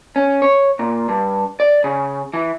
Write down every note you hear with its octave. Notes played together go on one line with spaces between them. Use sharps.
C#4
C#5
A#2
G2
D5
C#3
E3